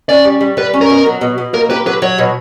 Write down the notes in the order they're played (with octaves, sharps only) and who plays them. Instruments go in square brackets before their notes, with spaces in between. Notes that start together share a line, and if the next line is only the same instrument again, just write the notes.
[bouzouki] C#4 [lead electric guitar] D5
[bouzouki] G3
G3
[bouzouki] G3 [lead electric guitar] B4
[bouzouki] C#4
[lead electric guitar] A#4
[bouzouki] B2
F#3
B2
B2
[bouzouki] A#3 [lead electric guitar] A#4
[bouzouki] G4 [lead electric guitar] B4
[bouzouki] F#3 [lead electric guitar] B4
[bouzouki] F#3 [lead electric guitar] C#5
[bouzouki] B2